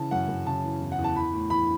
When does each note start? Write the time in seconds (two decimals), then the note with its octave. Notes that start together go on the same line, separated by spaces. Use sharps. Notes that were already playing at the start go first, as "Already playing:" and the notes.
Already playing: C#3 E3 A5
0.11 F#2 F#5
0.28 F#2
0.46 C#3 A5
0.64 E3
0.81 E2
0.92 F#5
0.98 E2
1.04 A5
1.16 E3 B5
1.33 A2
1.50 E3 B5